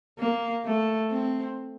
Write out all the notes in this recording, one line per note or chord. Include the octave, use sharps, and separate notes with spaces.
A#3
A3
C4